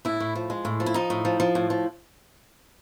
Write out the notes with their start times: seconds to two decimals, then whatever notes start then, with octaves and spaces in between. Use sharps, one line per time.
0.05 A2 E4
0.20 A2
0.35 F3
0.50 G#3
0.65 A2
0.80 F3
0.86 E4
0.94 F3 D#4
1.10 A2
1.25 F3
1.40 F3
1.55 A2
1.70 F3